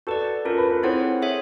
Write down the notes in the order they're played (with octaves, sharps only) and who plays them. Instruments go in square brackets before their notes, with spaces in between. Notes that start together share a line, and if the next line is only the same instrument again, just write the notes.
[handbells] F#4 B4 D5 [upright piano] A4
[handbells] C#4 F4 A4 [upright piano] A#4
[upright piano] B4
B4
[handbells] C4 E4 G#4 C#5 F#5 [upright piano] C5
[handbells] G#4 C#5 E5